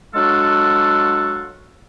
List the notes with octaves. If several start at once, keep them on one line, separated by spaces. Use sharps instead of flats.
F#3 G#3 D4 F4 F#4 A4